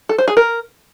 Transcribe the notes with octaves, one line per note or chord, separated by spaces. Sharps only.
A4
C5
G#4
A#4